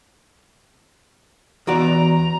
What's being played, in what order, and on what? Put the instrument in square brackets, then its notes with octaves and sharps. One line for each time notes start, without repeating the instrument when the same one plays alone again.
[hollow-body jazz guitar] E2 F#4 D5 [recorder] A#5